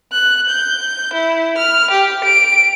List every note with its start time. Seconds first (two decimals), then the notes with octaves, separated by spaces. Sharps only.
0.12 F#6
0.48 G6
1.13 E4
1.57 F6
1.90 G4
2.24 D7